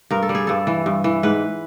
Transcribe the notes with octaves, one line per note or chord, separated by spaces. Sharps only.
G2 A#4
A4
G3
G#4
G2 A4
E3
G2
E3
G#2 B4